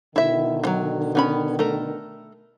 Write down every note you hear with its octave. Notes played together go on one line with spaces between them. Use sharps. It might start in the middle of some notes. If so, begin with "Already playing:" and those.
B2 D3 D#3 E4 E5
E3 F#3
B3 C#4 B5
A3 A#4